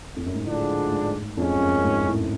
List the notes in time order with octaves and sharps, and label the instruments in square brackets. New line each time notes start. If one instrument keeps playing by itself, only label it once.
[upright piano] F2
F#2
G#2
[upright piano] A2 [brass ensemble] D3 F3 G#3 D4
[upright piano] G#2
[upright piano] F2 [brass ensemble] F3 G#3 C#4
[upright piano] F#2
F#2
G#2
A2